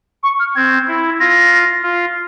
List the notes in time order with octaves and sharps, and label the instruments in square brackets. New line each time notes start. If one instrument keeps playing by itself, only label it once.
[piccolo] C#6
F6
[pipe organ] C4 [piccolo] G#6
[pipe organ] E4
[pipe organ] F4 [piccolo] A#6
[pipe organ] F4